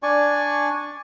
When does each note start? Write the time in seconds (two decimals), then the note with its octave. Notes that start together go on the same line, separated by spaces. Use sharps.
0.03 D4 D5 G#5 C#6